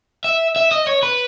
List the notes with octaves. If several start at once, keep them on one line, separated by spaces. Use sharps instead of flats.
E5
E5
D#5
C#5
B4